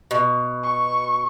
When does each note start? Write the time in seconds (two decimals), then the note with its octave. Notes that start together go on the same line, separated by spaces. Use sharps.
0.11 B2
0.63 C#6